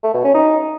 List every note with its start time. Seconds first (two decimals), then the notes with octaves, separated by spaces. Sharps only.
0.04 A3
0.14 B2
0.24 C#4
0.34 D#4